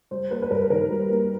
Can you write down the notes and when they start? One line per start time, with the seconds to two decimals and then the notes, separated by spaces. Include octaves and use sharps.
0.11 G3 C5
0.31 A#3 B4
0.42 B4
0.50 G2 A#4
0.62 B4
0.70 D#3 A#4
0.90 G3
1.10 A#3